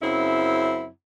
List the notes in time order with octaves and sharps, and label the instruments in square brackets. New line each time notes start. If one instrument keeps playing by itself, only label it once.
[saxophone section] F#2 C#3 C4 E4